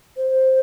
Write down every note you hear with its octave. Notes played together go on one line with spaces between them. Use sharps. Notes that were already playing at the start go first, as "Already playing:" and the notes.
C5